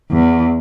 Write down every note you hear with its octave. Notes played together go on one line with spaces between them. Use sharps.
E2